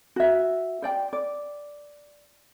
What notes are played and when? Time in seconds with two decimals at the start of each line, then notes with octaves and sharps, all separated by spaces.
0.16 F#4 E5
0.82 C5 D5 G5
1.13 D5